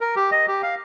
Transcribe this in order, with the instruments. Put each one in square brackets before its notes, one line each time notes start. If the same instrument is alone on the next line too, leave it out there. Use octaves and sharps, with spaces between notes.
[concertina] A#4
G4
D#5
G4
F5